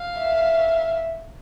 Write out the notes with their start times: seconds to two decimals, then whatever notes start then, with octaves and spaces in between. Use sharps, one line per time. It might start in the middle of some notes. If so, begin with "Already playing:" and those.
Already playing: F5
0.18 E5